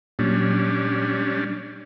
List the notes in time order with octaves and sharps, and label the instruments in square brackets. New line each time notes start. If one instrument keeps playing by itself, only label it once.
[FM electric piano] A#2 F#3 [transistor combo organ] G3 C#4 D4